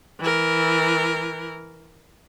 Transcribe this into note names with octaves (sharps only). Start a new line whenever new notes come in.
E3 A#4